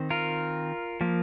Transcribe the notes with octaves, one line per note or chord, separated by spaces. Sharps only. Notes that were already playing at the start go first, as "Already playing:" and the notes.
Already playing: D#3 C4
F4 A#4
F3 A#3